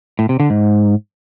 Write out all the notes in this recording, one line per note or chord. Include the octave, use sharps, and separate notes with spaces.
A2
C3
D3
G#2